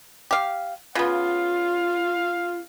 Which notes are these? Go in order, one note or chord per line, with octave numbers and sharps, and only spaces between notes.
G4 F5
C#3 B3 F4 F5